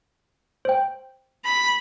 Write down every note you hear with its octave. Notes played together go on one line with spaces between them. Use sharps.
C5 G5
B5